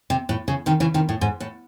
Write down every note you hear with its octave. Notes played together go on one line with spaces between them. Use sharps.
C3
A2
C#3
C3 D#3
C#3 E3
C3 D#3
A2
G#2
A2